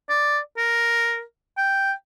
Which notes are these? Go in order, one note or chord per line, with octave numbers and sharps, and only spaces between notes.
D5
A#4
G5